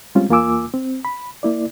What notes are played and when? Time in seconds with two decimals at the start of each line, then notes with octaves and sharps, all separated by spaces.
0.15 G3 G#3 C4 C#4 F4
0.30 E2 A#3 F4 G#5 D6 E6
0.74 C4
1.05 B5
1.43 A#3 E4 D5